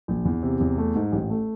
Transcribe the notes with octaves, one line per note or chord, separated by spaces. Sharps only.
A#1
E2
C3
E2
A3
G#2
A1
A3